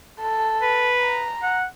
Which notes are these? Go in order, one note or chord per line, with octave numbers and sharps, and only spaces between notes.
A4
B4
A#5
F#5